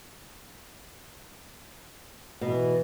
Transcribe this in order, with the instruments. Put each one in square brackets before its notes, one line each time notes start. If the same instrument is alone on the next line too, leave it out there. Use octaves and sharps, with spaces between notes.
[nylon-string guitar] B2 [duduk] E3